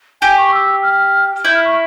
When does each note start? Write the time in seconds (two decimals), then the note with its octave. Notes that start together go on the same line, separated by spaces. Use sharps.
0.21 G4 G#5
0.38 C#6
0.52 E6
0.83 F6
1.44 E4 G6
1.55 F6
1.65 C#6